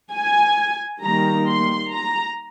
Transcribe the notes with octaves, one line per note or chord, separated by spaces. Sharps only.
G#5
D#3 G3 A#3 A#5
C6
A#5